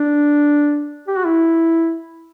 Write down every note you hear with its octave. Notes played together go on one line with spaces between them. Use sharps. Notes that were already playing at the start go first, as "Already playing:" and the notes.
Already playing: D4
G4
F#4
E4